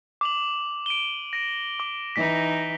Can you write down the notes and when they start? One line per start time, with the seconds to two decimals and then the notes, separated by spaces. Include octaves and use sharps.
0.21 D6 F7 F#7
0.86 D7 D#7 G7
1.33 A#6 D7
1.80 D6
2.16 E3 D#4 B6